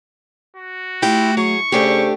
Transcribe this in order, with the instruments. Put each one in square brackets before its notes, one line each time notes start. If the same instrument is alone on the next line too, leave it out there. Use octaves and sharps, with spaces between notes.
[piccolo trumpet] F#4
[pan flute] A3 [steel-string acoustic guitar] E4 F4 [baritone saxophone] G4
[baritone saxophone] F#3 [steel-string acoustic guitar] G#4 [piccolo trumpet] C#6
[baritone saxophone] C#3 [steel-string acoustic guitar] A3 D4 G4 [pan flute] C5